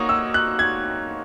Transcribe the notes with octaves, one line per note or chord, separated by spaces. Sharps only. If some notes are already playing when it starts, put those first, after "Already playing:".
Already playing: A#3 D#4 F#4 C#5 C#6 D#6
E6
F#6
G#6